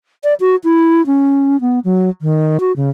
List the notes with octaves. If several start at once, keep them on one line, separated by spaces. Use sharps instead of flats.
D5
F#4
E4
C#4
B3
F#3
D#3
F#4
C#3